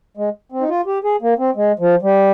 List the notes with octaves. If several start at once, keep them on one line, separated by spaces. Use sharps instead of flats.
G#3
C4
D#4
F4
G4
G#4
A#3
C4
G#3
F3
G3